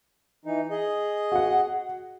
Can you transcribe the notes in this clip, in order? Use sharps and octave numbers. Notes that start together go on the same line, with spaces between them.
E3 D#4
G#4 D#5
F#4 F#5